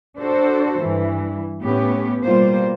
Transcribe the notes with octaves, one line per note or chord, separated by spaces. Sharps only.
D4 F#4 A4 C5
G2 E3
A2 B3 C#4 G4
B2 G3 A#3 F4 C5